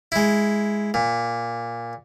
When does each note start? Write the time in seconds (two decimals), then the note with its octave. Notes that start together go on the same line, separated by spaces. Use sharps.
0.12 G#3 E4
0.94 A#2